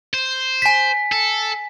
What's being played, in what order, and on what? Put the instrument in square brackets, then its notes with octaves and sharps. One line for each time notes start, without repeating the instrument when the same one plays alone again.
[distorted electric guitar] C5
[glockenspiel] G#5 B6
[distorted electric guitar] A4